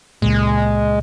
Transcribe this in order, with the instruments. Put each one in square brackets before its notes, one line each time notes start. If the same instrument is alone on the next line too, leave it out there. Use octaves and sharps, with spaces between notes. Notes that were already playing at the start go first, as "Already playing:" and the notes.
[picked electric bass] C#2 A#2 [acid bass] G#3